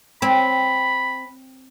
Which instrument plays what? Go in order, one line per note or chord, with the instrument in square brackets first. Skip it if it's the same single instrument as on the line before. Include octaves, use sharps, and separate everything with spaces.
[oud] C4 [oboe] B5